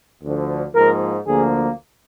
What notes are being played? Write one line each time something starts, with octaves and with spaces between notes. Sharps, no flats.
D2 D3 F3
G#2 F3 A#3 A#4
D2 D3 F3 A#3 G#4